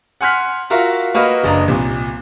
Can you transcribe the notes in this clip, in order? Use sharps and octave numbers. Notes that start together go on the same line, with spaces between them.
F#5 G#5 C6 F6 F#6 B6
F4 F#4 A#4 E5 F5
A#3 F#4 B4 D#5 B5 F6
F#1 D4 D#5 A#5
C2 A#2